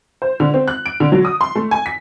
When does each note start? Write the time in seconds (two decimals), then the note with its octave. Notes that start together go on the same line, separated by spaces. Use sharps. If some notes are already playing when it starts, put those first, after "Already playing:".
0.22 C5
0.40 D3
0.54 C4
0.68 F#6
0.86 D7
1.00 D3
1.12 F#3
1.25 D#6
1.41 C6
1.56 A3
1.71 G#5
1.86 B6